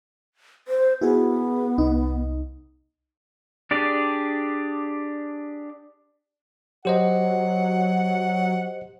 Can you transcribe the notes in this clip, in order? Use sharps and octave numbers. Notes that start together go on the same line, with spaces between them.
C5
B3 E4 F#4 G#4
C2 D#4
D4 G4 G#4 D5
F#3 G4 C5 D#5 F#5